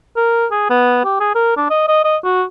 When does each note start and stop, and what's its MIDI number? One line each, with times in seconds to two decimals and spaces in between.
0.16 0.46 70
0.51 0.66 68
0.70 0.99 59
1.04 1.17 67
1.20 1.33 68
1.35 1.56 70
1.57 1.66 62
1.70 1.85 75
1.88 2.00 75
2.04 2.17 75
2.24 2.44 66